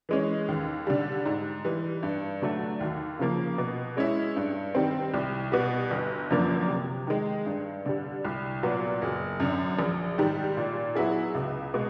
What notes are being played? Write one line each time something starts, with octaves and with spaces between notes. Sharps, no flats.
E3 G#3 C#4
D#2
D3 G3
G#2
E3 G3
G2
D3 F#3 A3
D#2
C#3 F3 A#3
B2
G#3 C#4 E4
G2
D#3 G3 C4
C2
B2 G3 B3
G1
F#2 D3 F3 A#3
C3
D#3 G#3
G2
D3 G3
C2
A#2 F#3 B3
F#1
F#2 D3
A#1
G#2 D#3 G3
A#2
F#3 B3 E4 G#4
C#2
B2 G#3